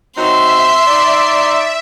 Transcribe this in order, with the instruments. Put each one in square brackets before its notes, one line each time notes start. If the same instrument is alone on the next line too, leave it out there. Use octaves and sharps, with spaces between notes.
[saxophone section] F#3 C4 D#4 [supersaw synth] E5 [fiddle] C6
[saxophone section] D#4 D5